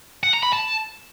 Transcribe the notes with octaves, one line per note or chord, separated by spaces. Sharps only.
F#5
A#5
B5
A5